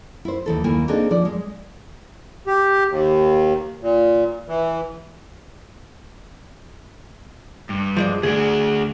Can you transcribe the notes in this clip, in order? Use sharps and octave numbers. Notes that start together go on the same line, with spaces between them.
E4 C5
D#2 E3 A4
D#2 A#3 E4 G#5
A#3 C4 D4 D#4 G#4 A4
F3 D5
G#3
G4
D#2
A#2
E3
G2
F3 G#3 D5
D2 D4 G#4